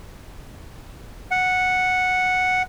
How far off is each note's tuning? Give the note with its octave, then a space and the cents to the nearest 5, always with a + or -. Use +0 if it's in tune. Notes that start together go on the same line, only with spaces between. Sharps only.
F#5 -5